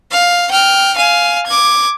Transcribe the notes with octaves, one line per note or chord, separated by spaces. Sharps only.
F5
G5 F6
F5 G#5
D6 G#6